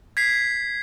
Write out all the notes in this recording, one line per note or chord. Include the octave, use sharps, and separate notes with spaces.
G#6 B6 C7